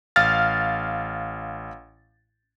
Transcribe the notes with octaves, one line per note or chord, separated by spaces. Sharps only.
A1 F5 F6 A6